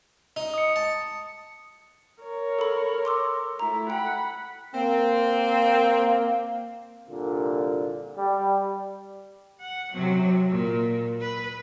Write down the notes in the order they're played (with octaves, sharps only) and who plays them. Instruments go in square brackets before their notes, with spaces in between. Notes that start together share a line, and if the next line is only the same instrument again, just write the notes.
[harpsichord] D#4
[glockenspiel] D#6 C#7
[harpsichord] A5
[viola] A#4 C#5
[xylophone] A4 B5
C6 D6 E6
[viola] A3 E4 [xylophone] A#5
[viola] F#5 B5 [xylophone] G5
[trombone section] A#3 [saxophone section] C4
[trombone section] C2 A#2 D3
G3
[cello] F#5
C3 F#3
A#2
B4